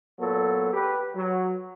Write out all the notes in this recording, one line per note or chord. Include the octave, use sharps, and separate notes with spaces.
A#2 F#3 B3 A4
G4 B4
F#3